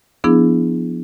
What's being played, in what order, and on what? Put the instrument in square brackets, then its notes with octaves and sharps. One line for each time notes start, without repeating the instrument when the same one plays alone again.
[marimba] F3 B3 D4 E4 G#4